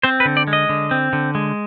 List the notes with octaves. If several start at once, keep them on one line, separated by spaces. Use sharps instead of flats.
C4 C5
B4
D3
D5
G#3
D#5
D3
C4
D3
G#3